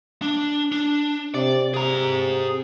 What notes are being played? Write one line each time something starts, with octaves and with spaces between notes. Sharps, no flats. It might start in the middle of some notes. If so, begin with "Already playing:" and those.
D4
D4
C3 D5
C3 G#4 A#5